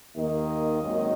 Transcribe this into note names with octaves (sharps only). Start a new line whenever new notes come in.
D#2 D#3 A#3 D#5
G#1 F#2 D#3 G#3